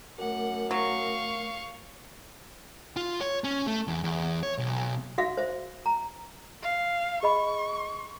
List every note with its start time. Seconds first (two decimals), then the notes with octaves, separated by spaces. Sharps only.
0.18 F#2 A3 A#4 F#5 D6
0.71 F#3 F5 C#6
2.96 F4
3.21 C#5
3.44 C#4
3.67 A3
3.88 E2
4.04 E2
4.43 C#5
4.58 B1
5.18 F#4 E5 F5
5.37 C5 E5
5.86 A#5
6.62 F5
7.23 G#4 D#5 B5 C#6